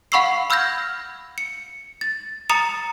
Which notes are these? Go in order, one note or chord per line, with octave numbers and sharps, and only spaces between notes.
F5 F#5 B5 C#6 E6 C7
B5 E6 F6 G6 G#6 A#6
C#7
A6
A#5 D#6 A6 C#7 E7 F7